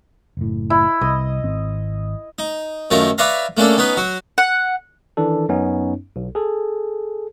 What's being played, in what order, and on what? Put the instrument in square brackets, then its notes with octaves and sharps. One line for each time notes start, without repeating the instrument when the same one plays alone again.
[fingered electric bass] F#1 A2
[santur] E4
[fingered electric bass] C2 [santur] D#5
[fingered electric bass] G#1 C4
[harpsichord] D#4
F#2 D#3 F3 A3 C#5 A#5
B4 C#5 D5 E5 F5 A#5
A3 A#3 C#4 D4 A4
B3 C#4 D#4 B4
F#3 F#4
[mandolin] F#5
[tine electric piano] D#3 E3 D4 A4
F#2 B3 C#4 D#4
B1
G#4 A4